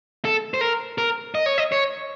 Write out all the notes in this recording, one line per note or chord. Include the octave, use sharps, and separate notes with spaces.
A4
C5
A#4
A#4
D#5
C#5
D#5
C#5